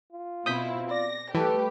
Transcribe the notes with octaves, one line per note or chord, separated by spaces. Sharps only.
F4
B2 C4 E4 D#6 G6 B6
D5 A#6
E3 G3 A3 G4 A4 B4